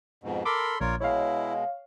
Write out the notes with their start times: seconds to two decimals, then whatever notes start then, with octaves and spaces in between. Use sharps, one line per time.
0.24 F2 G#2 B2
0.45 A4 A#4 B5 C6 D6
0.80 A#1 F4 A#4 C#5 D5
1.00 B2 G#3 E4 C#5 F5